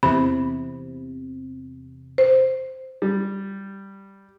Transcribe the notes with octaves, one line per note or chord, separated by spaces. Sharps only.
E2 C3 B5
C5
G3